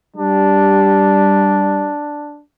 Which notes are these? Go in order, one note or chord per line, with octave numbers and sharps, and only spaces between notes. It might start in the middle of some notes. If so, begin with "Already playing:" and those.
G3 D4